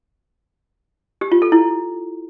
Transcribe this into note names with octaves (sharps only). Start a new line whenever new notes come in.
G4
F4
A4
E4